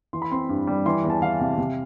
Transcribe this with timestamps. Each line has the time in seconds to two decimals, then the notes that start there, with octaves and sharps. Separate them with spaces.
0.13 E3 C6
0.22 B5
0.32 C4 C6
0.49 G2
0.67 G3
0.86 E3 C6
1.04 E2
1.10 A5
1.22 E3 F5
1.40 C3 F5
1.58 C3